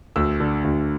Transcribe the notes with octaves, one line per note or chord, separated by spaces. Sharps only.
D2 E6
D3
D2